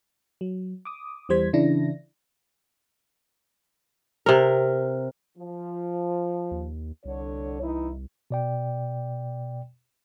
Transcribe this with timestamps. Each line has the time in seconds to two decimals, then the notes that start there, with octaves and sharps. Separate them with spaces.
0.41 F#3
0.85 D6 D#6
1.29 E2 E3 G3 C5 G#6 B6
1.53 C#3 E3 D4 E4 A#6
4.26 C3 A#4
5.37 F3
6.51 D#2
7.05 C2 D3 C#5
7.61 E3 D#4 E4
8.31 B2 D5 G5